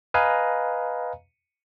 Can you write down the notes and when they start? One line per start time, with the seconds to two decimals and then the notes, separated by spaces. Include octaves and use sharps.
0.14 B4 D#5 F5 G#5 A#5